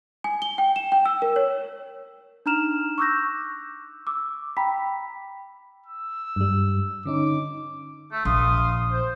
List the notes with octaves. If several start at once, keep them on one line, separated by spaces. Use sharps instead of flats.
G#5
G7
G5
E7
G5
E6
A#4
C#5
D4 D#4 A#5 F6 E7 F7
C#6 D6 E6 F#6 G6 A#6
D6 E6
G5 A#5 B5 B6
E6
G2 G3
D3 C#4 D#4 D6
A3
A#1 F5 C6 D#6
C5